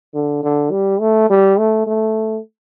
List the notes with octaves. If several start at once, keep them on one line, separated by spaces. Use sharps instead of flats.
D3
D3
G3
A3
G3
A3
A3